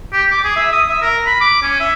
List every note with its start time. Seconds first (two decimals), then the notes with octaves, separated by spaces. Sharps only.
0.13 G4
0.31 D6
0.44 G#4
0.56 E5
0.72 D#6
0.89 E5
1.02 A#4
1.26 B5
1.41 D6
1.62 C#4
1.80 E5